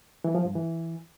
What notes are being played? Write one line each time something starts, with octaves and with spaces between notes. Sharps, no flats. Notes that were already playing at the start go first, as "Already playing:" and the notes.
E3
F3
G2
E3